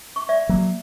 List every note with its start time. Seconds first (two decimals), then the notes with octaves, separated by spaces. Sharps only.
0.16 C#6
0.29 D5 E5
0.49 F#3 A#3